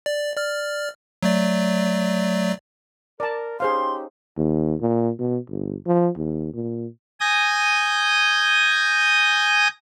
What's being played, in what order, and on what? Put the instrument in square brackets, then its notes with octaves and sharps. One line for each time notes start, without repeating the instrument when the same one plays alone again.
[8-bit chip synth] D5
D5 F6
F#3 A3 D5
[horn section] A#4 [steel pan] D5 A5
[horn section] C#4 D#4 G4 [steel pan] G#4 C5 F5 [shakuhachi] C6
[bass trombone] D#2
A#2
B2
G1
F3
D#2
A#2
[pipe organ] G#5 D#6 G6 A#6